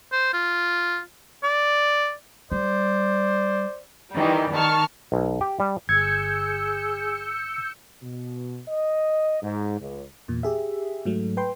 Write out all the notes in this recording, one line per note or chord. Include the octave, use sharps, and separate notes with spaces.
C5
F4
D5
G3 C5 D5
D#3 E3 G3
D#3 A5 C#6 F6
B1
G4
G3
G1 G#4 E6 G6 G#6 C#7
B2
D#5
G#2
C#2
E2 A#2
G4 G#4 E5
G#2 F#3 A3
B4 G5 C6